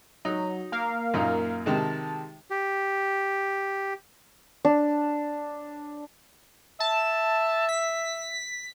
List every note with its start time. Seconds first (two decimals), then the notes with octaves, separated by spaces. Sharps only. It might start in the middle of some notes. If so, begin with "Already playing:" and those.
0.25 F#3 D#4
0.72 A#3 A#4 F5
1.14 F#2 A#2 D#4
1.66 C3 D#3 G#3 A5
2.50 G4
4.65 D4
6.80 E5 A5
7.69 B6